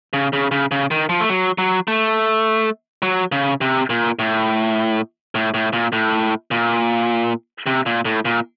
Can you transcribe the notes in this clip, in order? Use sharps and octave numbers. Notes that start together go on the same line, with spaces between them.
C#3
C#3
C#3
C#3
D#3
F3
A3
F#3
F#3
A3
F#3
C#3
C3
A#2
A2
A2
A2
A#2
A2
A#2
C3
A#2
A2
A#2